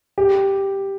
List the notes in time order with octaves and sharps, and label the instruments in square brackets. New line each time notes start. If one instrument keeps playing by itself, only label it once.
[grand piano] G4